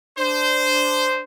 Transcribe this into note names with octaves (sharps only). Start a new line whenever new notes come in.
D4 C5